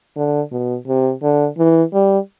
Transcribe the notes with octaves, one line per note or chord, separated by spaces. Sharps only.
D3
B2
C3
D3
E3
G3